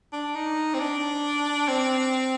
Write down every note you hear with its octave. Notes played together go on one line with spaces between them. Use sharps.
D4
D#4
C4
D4
C4